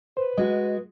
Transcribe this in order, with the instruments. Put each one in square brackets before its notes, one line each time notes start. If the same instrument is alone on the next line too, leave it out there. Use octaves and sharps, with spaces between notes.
[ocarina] B4 [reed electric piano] C5
[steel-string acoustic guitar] G#3 F#4 [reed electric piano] D#5